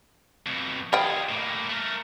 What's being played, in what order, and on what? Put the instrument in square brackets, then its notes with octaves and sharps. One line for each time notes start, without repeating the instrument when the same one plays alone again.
[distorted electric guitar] F2 B2
[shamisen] G3 D#5 G5 [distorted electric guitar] F4 G#4
[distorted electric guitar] A2 A#3
A3 A#4